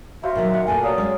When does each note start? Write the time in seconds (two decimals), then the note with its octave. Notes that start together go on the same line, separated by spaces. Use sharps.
0.23 F#4 C5 E5 F5
0.35 A#2 D#3 F#3
0.54 F#5
0.67 A#2 A3 A#3 G#5
0.83 F#3 D5 D#5 F5
0.98 G#3 C#4